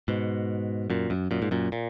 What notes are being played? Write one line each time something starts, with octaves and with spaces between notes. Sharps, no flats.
G#2 B2
F#2 A#2
F#2
F#2 A#2
G#2
F#2 A#2
A#2